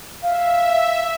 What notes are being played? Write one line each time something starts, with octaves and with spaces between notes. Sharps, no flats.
E5 F5